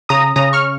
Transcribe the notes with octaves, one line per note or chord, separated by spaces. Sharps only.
C#3 A#5 D#6
C#3 A#5 D#6
C#6 F6